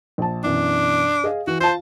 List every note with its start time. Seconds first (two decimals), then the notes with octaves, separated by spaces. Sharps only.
0.18 A#1 A5
0.44 F#2 B2 E3 D4
1.24 G#4 D#5 F5
1.47 E3 F#4
1.61 F4 C5 A5